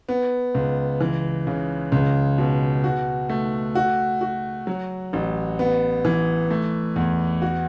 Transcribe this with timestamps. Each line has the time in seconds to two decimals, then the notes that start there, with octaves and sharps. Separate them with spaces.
0.09 B3
0.55 C#2
1.01 E3
1.47 C#3
1.92 C#2
2.38 B2
2.84 F#4
3.29 A3
3.75 F#4
4.21 F#4
4.67 F#3
5.13 A1
5.59 B3
6.05 E3
6.51 A3
6.96 E2
7.42 F#4